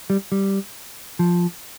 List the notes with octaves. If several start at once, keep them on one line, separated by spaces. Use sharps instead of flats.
G3
G3
F3